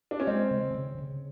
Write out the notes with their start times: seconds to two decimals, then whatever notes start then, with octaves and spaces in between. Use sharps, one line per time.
0.11 D4
0.20 C#4
0.27 G#3 C4
0.51 C#3
0.75 C#3
0.99 C#3